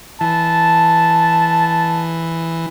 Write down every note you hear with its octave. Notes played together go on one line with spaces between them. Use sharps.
E3 A5